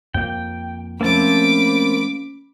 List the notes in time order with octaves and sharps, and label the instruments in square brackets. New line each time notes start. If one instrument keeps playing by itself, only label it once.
[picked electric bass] F2 A#3 [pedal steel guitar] G5
[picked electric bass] F3 A3 [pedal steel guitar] A#3 C4 A5 [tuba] C#4 [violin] B5 D6